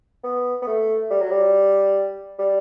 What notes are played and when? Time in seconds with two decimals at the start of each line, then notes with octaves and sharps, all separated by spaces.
0.24 B3
0.62 B3
0.67 A3
1.10 G3
1.21 F#3
1.31 G3
2.39 G3